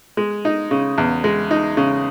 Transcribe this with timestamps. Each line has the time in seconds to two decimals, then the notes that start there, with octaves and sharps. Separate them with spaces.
0.17 G#3
0.45 D#4
0.71 C#3
0.98 E2
1.24 G#3
1.51 D#4
1.77 C#3